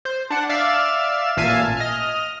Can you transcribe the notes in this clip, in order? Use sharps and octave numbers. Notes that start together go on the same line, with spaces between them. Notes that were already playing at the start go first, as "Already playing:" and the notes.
C5
D4 F#5
D5 E5 F5 E7
A1 A#2 E5 F5 G#5 A5
D#5 F6